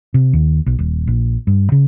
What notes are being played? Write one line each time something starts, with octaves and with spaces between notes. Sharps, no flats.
C3
D#2
B1
D#1
A#1
G2
C#3